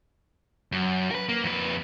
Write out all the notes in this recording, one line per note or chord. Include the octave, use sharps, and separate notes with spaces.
F#2
A#4 B4
A#3
F2 B4